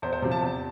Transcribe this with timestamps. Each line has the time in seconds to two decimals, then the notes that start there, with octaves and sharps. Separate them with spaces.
0.02 E2 C5
0.13 C5
0.22 C3 F3
0.31 A5
0.42 E2